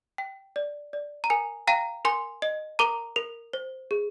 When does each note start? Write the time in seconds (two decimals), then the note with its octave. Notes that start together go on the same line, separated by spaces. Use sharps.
0.18 G5
0.56 D5
0.93 D5
1.24 A#5
1.30 A#4 G#5
1.67 F5 G5 A#5
2.05 A#4 G#5 C6
2.42 D#5
2.79 A#4 A#5 D6
3.16 A#4
3.53 C5
3.91 G#4